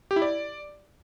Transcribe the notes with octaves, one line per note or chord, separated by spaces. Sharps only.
G4
E4
D5